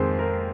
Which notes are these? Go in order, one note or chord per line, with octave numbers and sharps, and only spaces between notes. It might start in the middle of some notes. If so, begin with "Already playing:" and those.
Already playing: F2 D#3 G#3 G#4 C5
A#4